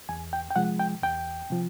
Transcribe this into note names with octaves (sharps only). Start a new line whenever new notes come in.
E2 G#5
G5
G5
C3 F3 G#3 F#5
G5
E2 G5
C3 F3